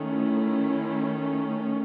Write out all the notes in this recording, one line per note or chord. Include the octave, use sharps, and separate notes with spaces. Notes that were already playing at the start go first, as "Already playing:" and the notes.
Already playing: D#3 A3 C#4
E4